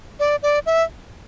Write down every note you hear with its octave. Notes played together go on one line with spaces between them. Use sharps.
D5
D5
E5